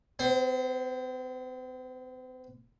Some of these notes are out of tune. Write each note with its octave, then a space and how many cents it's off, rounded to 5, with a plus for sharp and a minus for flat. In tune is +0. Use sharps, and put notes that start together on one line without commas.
C4 -45 C5 +15